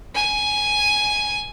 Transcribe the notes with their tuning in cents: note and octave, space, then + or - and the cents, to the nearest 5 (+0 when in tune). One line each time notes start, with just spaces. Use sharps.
G#5 +5